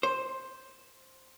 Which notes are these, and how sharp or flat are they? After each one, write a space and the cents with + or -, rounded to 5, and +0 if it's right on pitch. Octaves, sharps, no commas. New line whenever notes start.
C5 +5